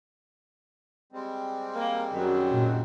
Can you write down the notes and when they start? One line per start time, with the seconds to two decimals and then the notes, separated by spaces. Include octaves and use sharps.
1.13 G3 G#3 C4
1.75 A#3
2.12 F#2 D#3 F#3
2.49 A#2